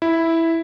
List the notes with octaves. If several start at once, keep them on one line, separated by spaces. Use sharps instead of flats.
E4